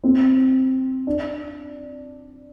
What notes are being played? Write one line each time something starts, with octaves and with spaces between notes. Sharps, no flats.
C4
D4